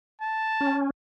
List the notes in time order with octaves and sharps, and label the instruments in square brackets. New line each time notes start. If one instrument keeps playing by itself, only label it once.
[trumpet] A5
[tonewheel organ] C#4